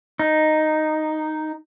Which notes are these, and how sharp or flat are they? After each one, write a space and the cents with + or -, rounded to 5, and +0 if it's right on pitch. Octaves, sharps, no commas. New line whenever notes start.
D#4 -5